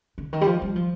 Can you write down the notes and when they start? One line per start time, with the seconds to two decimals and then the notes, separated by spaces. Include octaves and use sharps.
0.18 D3
0.33 D#3
0.41 G3
0.47 F3
0.62 G3
0.76 F3